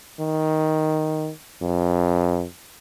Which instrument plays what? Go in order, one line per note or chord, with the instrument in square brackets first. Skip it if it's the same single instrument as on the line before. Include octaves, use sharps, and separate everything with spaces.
[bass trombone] D#3
F2